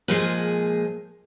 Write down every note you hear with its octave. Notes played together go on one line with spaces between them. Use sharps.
A#2 F3 G#3 G#4